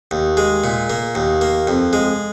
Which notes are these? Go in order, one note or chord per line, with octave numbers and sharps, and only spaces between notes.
D#2
G#3
A#2
A#3
D#2
A#3
F2
G#3